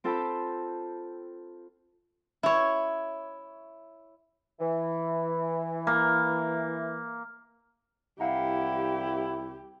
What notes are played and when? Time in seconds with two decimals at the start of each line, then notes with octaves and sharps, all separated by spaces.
0.04 C4 F4 A4 G5 A5 B5
2.43 E4 C#5
4.60 E3
5.87 A#3
8.20 C2 E4 G4 F5 F#5 A#5